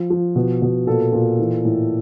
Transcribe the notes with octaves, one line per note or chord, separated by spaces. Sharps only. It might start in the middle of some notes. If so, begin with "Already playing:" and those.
Already playing: F3
F3
B2
B2
A#2 A4
A#2
E3
A2